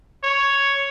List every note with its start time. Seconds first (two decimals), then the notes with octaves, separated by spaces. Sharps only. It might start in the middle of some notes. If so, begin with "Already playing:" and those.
0.24 C#5